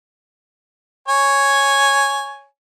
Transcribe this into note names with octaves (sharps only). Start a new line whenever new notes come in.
C#5 G#5